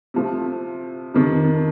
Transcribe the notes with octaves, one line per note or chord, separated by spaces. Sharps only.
C3 F3 A3
F2 C3 D#3